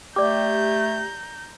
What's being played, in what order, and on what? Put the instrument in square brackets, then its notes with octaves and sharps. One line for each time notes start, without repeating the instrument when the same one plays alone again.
[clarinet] A3 [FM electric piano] G4 [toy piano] D5 D6 [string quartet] A#5 G6